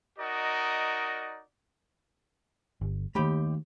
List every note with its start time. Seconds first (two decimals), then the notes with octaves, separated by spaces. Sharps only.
0.19 D#4 F#4 A#4 D5 D#5
2.81 G1
3.15 D#2 D#3 A3 G4 B5